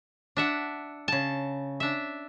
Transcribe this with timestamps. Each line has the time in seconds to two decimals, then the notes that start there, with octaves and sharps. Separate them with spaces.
0.37 D4 E5 F#5
1.08 C#3 A5
1.80 D4 E5